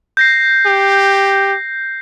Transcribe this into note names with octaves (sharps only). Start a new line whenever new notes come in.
G6 A#6 C7
G4